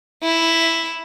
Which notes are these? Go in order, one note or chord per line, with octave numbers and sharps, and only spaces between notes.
E4